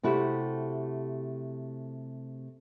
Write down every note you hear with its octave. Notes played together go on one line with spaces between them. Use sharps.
C3 A3 E4 F#4 G4